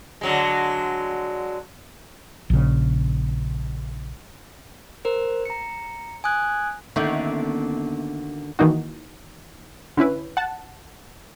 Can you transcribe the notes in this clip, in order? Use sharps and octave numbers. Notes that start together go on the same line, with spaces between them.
D3 F#3 G#3
A#1 C#3
A#4 C5
A#5 C#7
G#5 D#6 F#6 G#6
D2 D3 D#3 A#3 B3 C#4 E5
D#3 E3 A#3 D#4 F#4
D3 C#4 E4 B4
F#5 A5